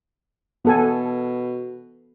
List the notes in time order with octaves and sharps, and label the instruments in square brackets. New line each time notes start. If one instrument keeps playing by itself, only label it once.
[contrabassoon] B2 [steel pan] B3 A4 G#5